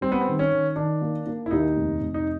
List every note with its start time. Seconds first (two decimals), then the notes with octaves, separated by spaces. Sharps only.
0.01 G3 C4
0.12 B3
0.21 C4
0.27 D#3
0.39 C#4
0.51 D#3
0.76 D#3 D4
1.01 A#3
1.26 A#3
1.46 E4
1.51 D#2 D#4
1.76 F1
2.01 F1
2.14 D#4